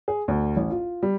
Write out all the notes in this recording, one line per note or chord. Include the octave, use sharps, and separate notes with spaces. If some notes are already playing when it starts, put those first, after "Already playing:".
G#4
D2
A1
F4
G3